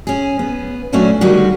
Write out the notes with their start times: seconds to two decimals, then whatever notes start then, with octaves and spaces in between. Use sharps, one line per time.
0.07 C#4 G#4
0.39 B3
0.92 A#2 F#3 A3 C#4 D4 F#4
1.21 D3 D#3 G3 G#3 F#4 G4